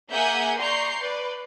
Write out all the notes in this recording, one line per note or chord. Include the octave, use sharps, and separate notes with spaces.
A#3 G#4 E5 F#5 G#5 G6
D5 A#5 C6 C#6 G6 C7
B4 D5